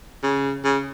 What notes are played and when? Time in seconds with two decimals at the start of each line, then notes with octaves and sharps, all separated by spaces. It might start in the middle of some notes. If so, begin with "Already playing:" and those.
0.23 C#3
0.64 C#3